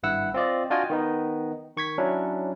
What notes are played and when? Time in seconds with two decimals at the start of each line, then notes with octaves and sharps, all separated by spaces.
0.03 G#1 G2 E4 F#5 E6
0.34 C4 F4 D5 D#5
0.70 D4 F4 F#4 D#5 G5 G#5
0.90 D#3 B3 D#4
1.76 D#3 C#6 G#6 B6
1.98 F#3 C#4 D4 E4